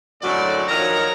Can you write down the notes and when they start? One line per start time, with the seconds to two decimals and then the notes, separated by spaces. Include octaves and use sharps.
0.22 F#2 A2 D3 F#3 G#3 D5
0.68 D#3 F3 F#3 A#4 C#5 A#5